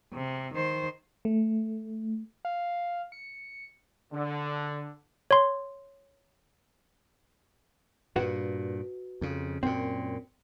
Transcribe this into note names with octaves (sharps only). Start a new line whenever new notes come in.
C3
D#3 C5
A3
F5
C#7
D3
C#5 C6
G2 A#2 F#4 B4 F#5
F2 C#3
F#2 A#2 C4